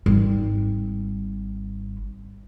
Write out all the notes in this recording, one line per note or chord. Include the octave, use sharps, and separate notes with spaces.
G#1 G3